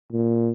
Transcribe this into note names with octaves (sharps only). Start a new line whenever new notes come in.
A#2